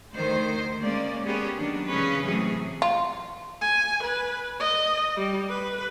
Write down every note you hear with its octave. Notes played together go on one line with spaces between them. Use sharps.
D2 D#3 A3 C5
G#3 A#3 C#4 D5
A#3 B3 C#4 G4 G#4
D#3 F#3 D4
C#3 E3 G#3 C#4 G#4 B4
A2 C3 E3 F#3 A3 G#4
F4
G#5
B4
D#5
G3
B4